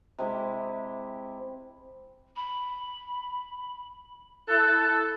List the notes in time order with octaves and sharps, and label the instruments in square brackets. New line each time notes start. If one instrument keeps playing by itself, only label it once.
[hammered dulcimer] C3 G#3 E4 G4
[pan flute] B5
[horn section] E4 A4 [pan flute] F#6